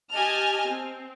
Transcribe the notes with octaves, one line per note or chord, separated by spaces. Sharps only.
G4 D#5 G#5 A5 F6
C4